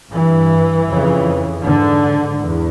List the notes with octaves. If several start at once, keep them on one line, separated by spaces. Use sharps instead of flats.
G2 E3
F2 C#3
G#2 D3
E2